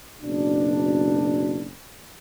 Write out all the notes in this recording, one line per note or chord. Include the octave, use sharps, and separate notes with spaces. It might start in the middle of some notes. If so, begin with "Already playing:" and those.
F#1 B2 D4